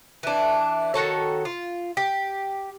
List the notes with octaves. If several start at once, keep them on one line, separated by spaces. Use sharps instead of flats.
E3 D4
D#3 F#4 A4 C#5
F4
G4